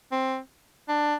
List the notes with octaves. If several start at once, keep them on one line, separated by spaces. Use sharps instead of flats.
C4
D4